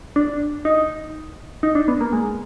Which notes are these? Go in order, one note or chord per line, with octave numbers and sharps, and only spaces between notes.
D4
D#4
D#4
D4
B3
A#3
G#3